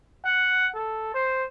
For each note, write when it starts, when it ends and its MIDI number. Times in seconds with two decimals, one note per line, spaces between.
0.25 0.68 78
0.74 1.12 69
1.14 1.46 72